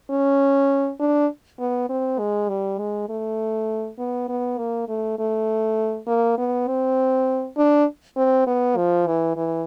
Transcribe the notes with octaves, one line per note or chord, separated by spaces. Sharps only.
C#4
D4
B3
C4
G#3
G3
G#3
A3
B3
B3
A#3
A3
A3
A#3
B3
C4
D4
C4
B3
F3
E3
E3